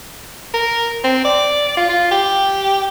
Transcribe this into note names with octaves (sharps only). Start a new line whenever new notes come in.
A#4
C4
D5
F4
F4
G4